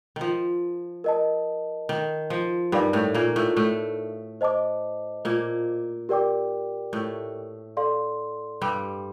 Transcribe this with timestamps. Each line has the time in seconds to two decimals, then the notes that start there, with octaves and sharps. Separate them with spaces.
0.16 D#3 F3
1.04 A#4 D#5 A5
1.89 D#3
2.30 F3
2.72 G2 G3 D#4 A#4 D5 F5
2.93 A2 A3
3.14 A#2 A#3
3.36 A2 A3
3.56 A2 A3
4.41 C5 D#5 A5 D6
5.25 A#2 A#3
6.09 G4 A#4 D5 G5 D6
6.93 A2 A3
7.77 A4 D5 F5 C6
8.62 G2 G3